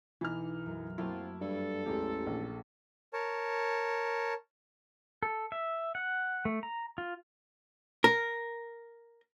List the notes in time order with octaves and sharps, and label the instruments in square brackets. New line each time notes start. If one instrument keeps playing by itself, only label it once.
[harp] B1 [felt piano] E3 D#4 F6
[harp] F#2
[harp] F#3 A3 A#3 [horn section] C4 F4 [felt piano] E4
[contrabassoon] G2 [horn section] A4
[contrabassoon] A1 [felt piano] E2 G#3 G4 [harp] F5 A#5 C6
[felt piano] A#1
[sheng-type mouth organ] A#4 C#5 A5
[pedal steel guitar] A4
E5
F#5
A3
A#5
F4
[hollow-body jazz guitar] A#4